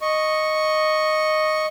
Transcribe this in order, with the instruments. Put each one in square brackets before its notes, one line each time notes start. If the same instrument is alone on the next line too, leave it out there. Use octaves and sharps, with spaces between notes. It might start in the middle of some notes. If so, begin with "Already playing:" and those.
[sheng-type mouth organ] D#5 C#6